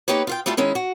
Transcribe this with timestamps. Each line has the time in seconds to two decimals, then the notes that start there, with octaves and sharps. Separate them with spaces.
0.08 A#3 D#4 G4 B4 C#5
0.27 F4 F5 G5
0.46 G3 A3 E4 F4 A4
0.57 D#3 G#3 C#4 E4
0.75 F#4